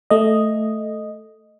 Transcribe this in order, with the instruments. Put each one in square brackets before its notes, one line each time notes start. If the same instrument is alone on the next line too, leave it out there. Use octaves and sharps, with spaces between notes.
[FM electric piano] A3 D#5